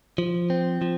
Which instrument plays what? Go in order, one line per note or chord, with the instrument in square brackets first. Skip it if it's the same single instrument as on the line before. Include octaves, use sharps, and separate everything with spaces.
[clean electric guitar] F3
C4
F3